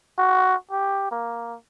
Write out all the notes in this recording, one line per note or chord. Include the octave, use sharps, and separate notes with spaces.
F#4
G4
A#3